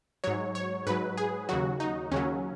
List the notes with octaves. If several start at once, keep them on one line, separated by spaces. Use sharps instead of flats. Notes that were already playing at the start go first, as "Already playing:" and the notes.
G#2 F#3 C#5
C#5
G#2 F#3 B4
G#4
D#2 C#3 F#3 F#4
D#4
D#2 C#3 F#3 C#4